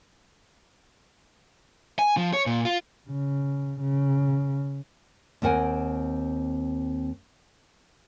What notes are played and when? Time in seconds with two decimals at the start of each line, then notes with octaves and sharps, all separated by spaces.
1.99 G#5
2.17 F3
2.33 C#5
2.46 A#2
2.65 F4
3.10 C#3
3.80 C#3
5.42 D#2 C4 A#4 F#5 G#5